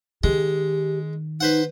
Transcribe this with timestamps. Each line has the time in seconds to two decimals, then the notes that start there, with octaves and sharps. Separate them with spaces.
0.24 D#3 G#3 G4
1.41 D#4 B4 C5 F#5